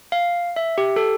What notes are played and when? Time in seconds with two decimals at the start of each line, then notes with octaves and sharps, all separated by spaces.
0.12 F5
0.56 E5
0.78 G4
0.96 A4